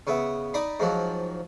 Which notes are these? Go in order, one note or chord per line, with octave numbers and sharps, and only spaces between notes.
C#3 B3 E5
D#4 D5 B5 D#6
G#2 F3 F#3